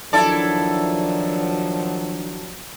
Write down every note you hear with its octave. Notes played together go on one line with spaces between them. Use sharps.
D#3 F3 F#3 D4 E4 A4 D5 A5